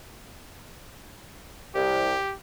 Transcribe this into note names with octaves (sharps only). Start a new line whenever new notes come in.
C2 G4